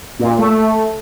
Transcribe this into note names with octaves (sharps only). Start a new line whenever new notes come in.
A#2
A3